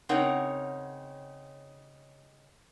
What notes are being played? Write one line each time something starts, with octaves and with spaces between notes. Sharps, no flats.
C#3 C4 D#4 A#4 C#5 F#5